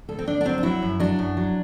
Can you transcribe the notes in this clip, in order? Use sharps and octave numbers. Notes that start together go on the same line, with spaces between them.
D2 A4
C4
D2 D4
D4
F#3 C4
D4
F#3 E4
F#2
F#3 D4
F#2
F#3